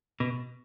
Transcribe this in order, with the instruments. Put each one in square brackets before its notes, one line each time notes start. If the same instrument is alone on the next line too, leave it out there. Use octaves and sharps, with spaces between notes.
[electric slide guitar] B2